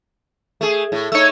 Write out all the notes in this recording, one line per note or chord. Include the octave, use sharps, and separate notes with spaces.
A3 G#4
A2
A3 D#4 C#5 E6